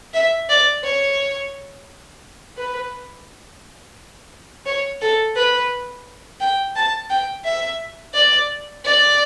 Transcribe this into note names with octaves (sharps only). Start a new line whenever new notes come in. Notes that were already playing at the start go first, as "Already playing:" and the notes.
E5
D5
C#5
B4
C#5
A4
B4
G5
A5
G5
E5
D5
D5